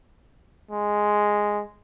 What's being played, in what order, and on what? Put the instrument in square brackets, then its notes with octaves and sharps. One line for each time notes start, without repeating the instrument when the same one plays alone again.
[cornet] G#3